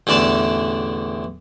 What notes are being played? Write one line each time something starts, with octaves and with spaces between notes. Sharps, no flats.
A1 E2 D3 D5 A5